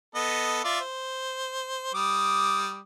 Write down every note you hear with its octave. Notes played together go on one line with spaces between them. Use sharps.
B3 A4 D#5
F4 D5 E5
C5
G3 D6 D#6